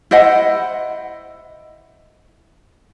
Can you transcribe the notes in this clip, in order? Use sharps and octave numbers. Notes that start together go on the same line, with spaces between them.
E4 C5 D#5 F#5